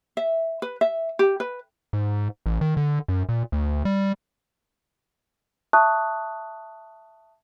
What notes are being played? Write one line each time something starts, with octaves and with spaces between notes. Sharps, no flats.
E5
B4
E5
G4
B4
G#2
A1
D#3
D3
F#2
A#2
D2
G3
E5 A5 C#6 D#6 F#6